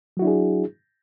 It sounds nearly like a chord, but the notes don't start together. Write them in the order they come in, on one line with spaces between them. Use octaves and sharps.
F#3 F#4 E4 D4 G#4